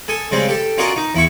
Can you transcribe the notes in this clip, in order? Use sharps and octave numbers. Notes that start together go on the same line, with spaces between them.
A4 G#5 D#6
C#3 G3 G#3 C4
G4 A4
C#4 F4 F#4 A#4 D5 D#5
D#4
E2 E4 C#6